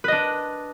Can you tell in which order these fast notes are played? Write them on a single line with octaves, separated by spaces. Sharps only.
B4 D#5 D4